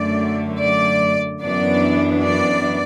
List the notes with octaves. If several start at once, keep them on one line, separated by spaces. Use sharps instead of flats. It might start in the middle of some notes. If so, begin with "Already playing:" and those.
Already playing: F#2 D3 A3 D5
D5
F#2 E3 B3 D4 D5
D5